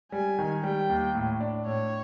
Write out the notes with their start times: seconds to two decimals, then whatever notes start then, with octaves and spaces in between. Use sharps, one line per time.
0.12 G3 G#5
0.39 D#3
0.64 G3 G5
0.89 D#2
1.15 A2
1.40 D4
1.66 A2 C#5